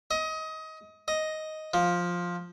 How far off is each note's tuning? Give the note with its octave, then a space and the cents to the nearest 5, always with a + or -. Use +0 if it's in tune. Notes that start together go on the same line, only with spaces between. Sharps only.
D#5 +25
D#5 +5
F3 +10